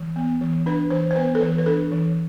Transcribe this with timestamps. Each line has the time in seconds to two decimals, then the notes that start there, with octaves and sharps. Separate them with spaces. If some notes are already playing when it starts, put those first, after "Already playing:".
Already playing: E3
0.16 B3
0.41 E3
0.66 D4 B4
0.91 E3 C5
1.11 C5
1.16 B3 B4
1.35 A4
1.40 E3 B4
1.58 B4
1.66 D4 A4
1.91 E3